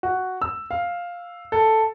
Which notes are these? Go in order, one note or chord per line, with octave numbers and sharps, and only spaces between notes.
F#4
E6
F5
A4